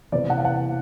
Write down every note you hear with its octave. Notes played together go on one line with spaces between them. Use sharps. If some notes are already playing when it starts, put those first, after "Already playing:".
E2 C3 E3 D5
F#5
F5
F#5